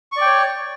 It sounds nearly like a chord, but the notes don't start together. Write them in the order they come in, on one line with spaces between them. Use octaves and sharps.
C#6 D5 G5 C#5